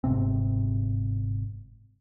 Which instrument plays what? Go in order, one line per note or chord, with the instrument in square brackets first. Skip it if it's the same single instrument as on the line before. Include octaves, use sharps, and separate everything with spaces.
[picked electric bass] G1 G#2 C3 C4